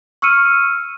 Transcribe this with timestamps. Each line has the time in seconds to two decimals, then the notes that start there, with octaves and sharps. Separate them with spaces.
0.22 C#6 E6 F6 C#7 D#7